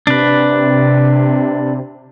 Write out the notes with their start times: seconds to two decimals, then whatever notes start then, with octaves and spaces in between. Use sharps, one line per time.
0.07 C3 D4 B4